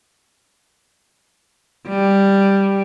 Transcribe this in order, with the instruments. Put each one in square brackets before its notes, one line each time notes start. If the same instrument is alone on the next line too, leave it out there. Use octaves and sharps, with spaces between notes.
[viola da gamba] G3